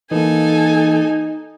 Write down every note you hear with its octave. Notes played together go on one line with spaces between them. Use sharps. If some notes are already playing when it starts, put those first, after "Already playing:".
E3 A#3 D#4 A4 G#5